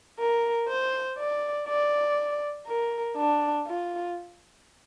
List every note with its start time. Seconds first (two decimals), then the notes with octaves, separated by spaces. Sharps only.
0.19 A#4
0.68 C5
1.18 D5
1.68 D5
2.67 A#4
3.17 D4
3.67 F4